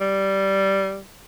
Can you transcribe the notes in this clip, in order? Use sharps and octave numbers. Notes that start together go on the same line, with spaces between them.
G3